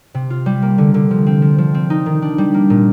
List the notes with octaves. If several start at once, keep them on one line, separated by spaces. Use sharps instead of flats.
C3
F4
G3
A#3
D3
D3
F3
C4
F3
F3
C4
D#4
D#3
D4
G3
A#3
A#2